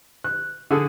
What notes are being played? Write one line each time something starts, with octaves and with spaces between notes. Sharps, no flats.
F#6
D3 G#4 A4